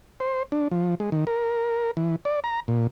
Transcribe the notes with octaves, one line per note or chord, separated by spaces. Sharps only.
C5
D4
F3
G#3
D#3
A#4
E3
D5
A#5
A#2